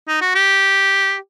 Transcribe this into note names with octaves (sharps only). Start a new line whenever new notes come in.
D#4
F#4
G4